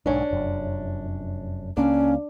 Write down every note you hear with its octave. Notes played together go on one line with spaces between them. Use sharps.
B1 G#2 C#4 D4
F1 F#2
C#2 A#3 C#4 D4